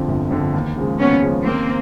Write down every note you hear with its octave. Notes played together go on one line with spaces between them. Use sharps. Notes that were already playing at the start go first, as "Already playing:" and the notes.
Already playing: F2 D3 F3
G1
F2 D3 F3
D#2
C#3 F3 G#3
D#2 B3 C#4
C#3 F3 G#3
D#2 A#3 C4